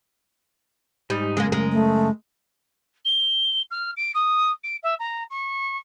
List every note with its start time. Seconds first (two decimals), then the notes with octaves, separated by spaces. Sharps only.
1.10 G#2 G3 D#4
1.37 F#2 C#3 G#3 A#3
1.52 G#3 A#4
1.72 A3
3.05 G7
3.71 F6
3.97 D7
4.14 D#6
4.64 D7
4.83 E5
4.99 A#5
5.30 C#6